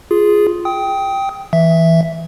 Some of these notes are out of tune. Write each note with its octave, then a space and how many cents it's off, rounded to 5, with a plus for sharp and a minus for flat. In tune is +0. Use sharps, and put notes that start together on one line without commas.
F4 +0 G#4 +0
G5 +0 D#6 +25
E3 +0 E5 +0